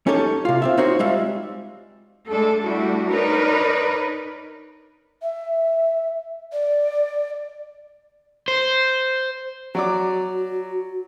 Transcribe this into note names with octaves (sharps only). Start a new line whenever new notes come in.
C#4 D#4 G4 A4 C#5
C3 F4
C4 F4 E5
C4 D#4 F4 F#4 C5 C#5
G3 G#3 F4 E5
G#3 A3 D4 A4
G3 A3 D4 E4 F#4
D4 D#4 A#4 B4 C#5 D5
E5
D5
C5
F#3 F#4 D5 D6